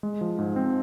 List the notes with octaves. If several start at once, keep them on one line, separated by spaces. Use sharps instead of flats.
G#3
F3
G#2
C4